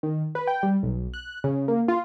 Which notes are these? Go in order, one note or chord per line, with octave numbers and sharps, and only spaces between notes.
D#3
B4
G5
G3
B1
F#6
C#3
A#3
F4